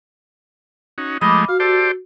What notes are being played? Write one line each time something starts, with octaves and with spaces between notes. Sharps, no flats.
C#4 D#4 F#4
F3 G#3 A3 D#5 B5 D6
F#4 F5
G4 A4 C5 D5